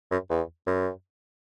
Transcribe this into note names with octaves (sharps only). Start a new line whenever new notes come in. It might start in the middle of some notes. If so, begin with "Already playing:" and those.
F#2
E2
F#2